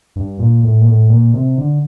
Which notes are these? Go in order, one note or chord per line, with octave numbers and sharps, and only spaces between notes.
G2
A#2
A2
A#2
A2
A#2
C3
D3